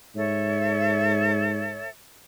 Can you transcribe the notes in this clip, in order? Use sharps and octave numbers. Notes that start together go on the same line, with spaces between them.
G#2 A4 C#5 E5